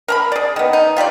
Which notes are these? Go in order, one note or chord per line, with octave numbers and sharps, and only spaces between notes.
A#4 A#5 B5
G#4 D5
D#3 B3
D#4
F4 G4 B4 D5